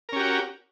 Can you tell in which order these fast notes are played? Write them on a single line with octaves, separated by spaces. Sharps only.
A#4 C#4 G4 F#4